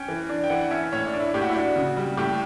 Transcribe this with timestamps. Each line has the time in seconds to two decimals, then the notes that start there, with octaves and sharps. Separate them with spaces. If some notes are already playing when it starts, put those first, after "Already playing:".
Already playing: C#4 G5
0.08 E3
0.30 D4
0.44 G5
0.50 E3 F#5
0.61 F#5
0.71 C#4 E5
0.93 A2 C#5
1.06 D5
1.13 D4
1.20 E4
1.34 A2 G4
1.42 F#4
1.49 E4
1.56 D4 F#4
1.76 C#3
1.97 G3
2.17 A2 G4